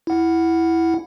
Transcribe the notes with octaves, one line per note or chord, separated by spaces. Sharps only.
E4 F#5